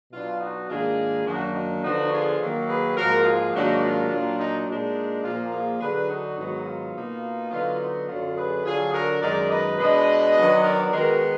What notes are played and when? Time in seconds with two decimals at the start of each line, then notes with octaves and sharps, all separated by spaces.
0.12 B2 F#3 D4 F4
0.41 D#4 F#4
0.69 G#2 D#3 A#3 D4 F4 G#4
1.26 F#2 D#3 F#3 A#3 D4 D#4 F#4
1.55 D#4
1.83 D3 F3 B3 D4 D#4 F#4
2.12 F4 G#4
2.40 D#3 F#3 A#3
2.68 G#4 B4
2.96 G#2 F3 A#3 F#4 A#4
3.25 F4 G#4
3.53 G#2 D#3 F#3 A#3 D4 D#4 F#4
3.82 F4
4.10 A#2 F#3 D4
4.39 D#4
4.67 A#2 G#3 D4 D#4
5.23 A#2 F3 A#3 F4
5.52 F4 G#4
5.81 D3 F#3 D4 G#4 B4
6.09 D#4 F#4
6.38 G#2 D#3 F#3 B3 D#4
6.65 F4
6.95 B2 A#3 D#4
7.51 D3 F#3 B3 D#4 F4
7.80 D#4
8.07 F#2 D3 F#3 F4
8.36 G#4 B4
8.65 D3 F#3 D4 F4 G#4
8.93 F#4 A#4
9.21 F#2 D#3 G#3 D#4 A#4 D5
9.50 B4 D#5
9.79 B2 G#3 D4 B4 D#5
10.36 D#3 F#3 B3 D4
10.63 A#4 D5
10.92 D#3 G#3 B3 F#4 A#4